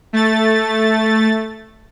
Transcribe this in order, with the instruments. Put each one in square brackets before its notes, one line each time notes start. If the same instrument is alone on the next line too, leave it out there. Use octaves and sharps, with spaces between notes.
[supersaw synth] A3 A6